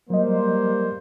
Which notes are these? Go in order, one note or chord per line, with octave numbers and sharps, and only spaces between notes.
F#3 G3 A#3 C5 D#5